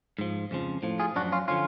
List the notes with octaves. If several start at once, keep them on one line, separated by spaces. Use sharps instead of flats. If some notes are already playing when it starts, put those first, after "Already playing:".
G#2 F3
F2 C#3 F3
A2 F3
F4 G#4
F#2 F3 D4 F#4
C#4 F4
D3 F3 C#4 F4